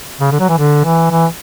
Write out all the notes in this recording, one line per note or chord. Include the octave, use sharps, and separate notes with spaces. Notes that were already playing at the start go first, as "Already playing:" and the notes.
C#3
D3
F#3
E3
D3
E3
E3